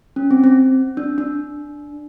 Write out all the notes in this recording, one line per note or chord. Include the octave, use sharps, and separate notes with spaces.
C#4
C4
C4
D4
D4